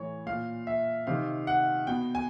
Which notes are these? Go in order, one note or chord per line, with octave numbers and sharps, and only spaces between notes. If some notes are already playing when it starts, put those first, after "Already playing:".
Already playing: A2 E3 C#5
A#2 F5
E5
C3 D#3 F5
F#5
B2 G5
G#5